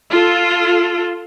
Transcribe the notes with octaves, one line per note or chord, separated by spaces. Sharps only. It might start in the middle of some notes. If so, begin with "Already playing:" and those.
F4 A4